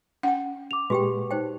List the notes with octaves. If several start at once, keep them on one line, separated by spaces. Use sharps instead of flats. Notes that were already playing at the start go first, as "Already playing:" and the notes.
C#4 F#5 G5
D6 F7
A#2 G#3 F#4 G4 B4 G5
D#4 C5 G5